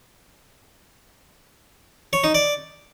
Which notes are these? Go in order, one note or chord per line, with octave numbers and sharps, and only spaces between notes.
C#5
D#4
D5